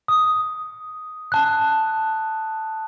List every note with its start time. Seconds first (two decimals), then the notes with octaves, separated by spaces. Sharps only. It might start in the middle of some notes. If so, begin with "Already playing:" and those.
0.08 D#6
1.32 A5 F#6